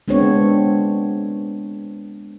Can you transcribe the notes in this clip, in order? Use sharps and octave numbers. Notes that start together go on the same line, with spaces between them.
G#3 B3 C4 D4 C#5